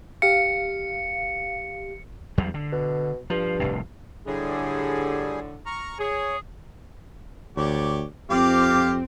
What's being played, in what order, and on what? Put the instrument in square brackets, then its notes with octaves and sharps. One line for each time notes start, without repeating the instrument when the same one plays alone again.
[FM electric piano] G4 F5 [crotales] C#7
[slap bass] E2 F#3 G3
D3
[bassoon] B2
[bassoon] G2 [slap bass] F3
[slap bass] F1 C2 A2
[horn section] A2 D3 [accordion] G3 G#4
[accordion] A#5 C#6 F6
[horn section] G#4 [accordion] C#5
[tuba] D2 [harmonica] G4 C#5 D5
[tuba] F2 [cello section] C4 [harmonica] F4 F5 D6 [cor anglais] G4